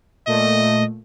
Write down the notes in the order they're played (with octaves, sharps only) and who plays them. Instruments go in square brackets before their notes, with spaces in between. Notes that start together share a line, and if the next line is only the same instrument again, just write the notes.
[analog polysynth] A#2 A3 [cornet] D#5